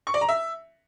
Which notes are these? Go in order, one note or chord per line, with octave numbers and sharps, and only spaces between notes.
C#6
D5
A#5
E5